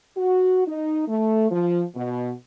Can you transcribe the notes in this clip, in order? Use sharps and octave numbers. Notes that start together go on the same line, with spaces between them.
F#4
D#4
A3
F3
B2